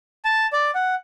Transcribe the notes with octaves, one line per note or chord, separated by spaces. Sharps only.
A5
D5
F#5